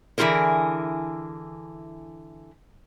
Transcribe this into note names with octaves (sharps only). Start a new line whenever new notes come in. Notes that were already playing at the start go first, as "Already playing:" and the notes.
D3 E3 E4 F4 G#4 A#4